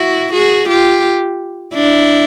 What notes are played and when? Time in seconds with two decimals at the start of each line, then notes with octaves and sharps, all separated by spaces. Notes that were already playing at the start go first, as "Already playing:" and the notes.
Already playing: E4 F#4
0.33 F#4 G#4
0.68 F4 G4
1.74 D4 E4